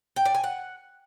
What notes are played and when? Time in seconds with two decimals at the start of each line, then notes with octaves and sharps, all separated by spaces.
0.16 G5
0.25 D5
0.35 G#5
0.44 F#5